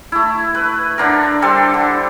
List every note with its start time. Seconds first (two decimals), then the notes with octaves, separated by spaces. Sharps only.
0.12 A3 E4
0.55 B4
0.98 D3 D4 A#4
1.42 G3 A4 C5 C6
1.74 D3